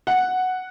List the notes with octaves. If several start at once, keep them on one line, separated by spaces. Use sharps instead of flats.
F#5